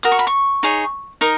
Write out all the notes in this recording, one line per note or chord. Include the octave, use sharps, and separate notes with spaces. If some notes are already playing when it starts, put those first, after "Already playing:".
F#4 A#4 D#6
C#6
B5
C#6
D#4 G#4 C#5
D#4 A#4 D#6